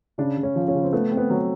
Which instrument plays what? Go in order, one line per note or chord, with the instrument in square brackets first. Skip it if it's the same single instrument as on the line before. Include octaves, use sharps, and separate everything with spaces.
[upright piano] C#3 [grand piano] D4
[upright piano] C#3
[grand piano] C#4
[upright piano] F3
[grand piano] C#4
[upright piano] C#3
[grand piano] C4
[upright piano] A3 [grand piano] B3
[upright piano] C4
[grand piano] B3
[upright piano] F#3